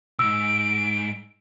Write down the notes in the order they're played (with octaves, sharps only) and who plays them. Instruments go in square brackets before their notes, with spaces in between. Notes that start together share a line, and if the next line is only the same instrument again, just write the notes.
[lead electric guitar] C2 G#2 [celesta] E6 [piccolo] D7